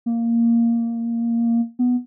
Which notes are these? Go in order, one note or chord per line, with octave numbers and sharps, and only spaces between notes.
A#3
B3